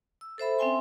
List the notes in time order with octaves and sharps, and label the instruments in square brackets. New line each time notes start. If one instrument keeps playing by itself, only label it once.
[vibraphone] E6
A4 C5 E5 B5
C4 C#4 E5 G5 G#5 C6